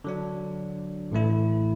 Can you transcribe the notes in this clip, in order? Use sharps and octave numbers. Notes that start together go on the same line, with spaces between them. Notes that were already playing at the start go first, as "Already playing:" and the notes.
D3 F#3 D4
A1 A2 E3 A3 E4